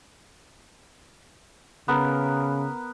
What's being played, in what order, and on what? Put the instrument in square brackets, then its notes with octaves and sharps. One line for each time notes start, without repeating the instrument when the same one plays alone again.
[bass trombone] C#3 [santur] B3 A#4